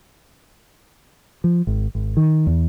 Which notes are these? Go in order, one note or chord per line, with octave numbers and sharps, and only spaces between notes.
F3
G#1
G#1
D#3
E2